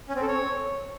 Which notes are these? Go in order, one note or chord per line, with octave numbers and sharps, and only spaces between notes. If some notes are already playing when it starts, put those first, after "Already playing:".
C#4
C4
A4
C#5